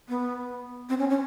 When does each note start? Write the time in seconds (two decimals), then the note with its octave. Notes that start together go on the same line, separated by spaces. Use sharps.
0.09 B3
0.89 C4
0.99 C#4
1.10 C#4